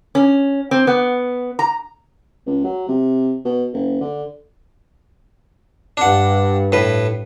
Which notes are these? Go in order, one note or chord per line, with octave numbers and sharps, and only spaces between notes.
C#4
C4
B3
A#5
C#2
F#3
C3
B2
F#1
D3
G2 D4 F#5
A2 B4